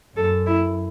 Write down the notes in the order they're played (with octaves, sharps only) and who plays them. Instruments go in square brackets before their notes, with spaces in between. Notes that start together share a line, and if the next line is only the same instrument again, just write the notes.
[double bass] F#2 [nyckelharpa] A4
[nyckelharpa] E4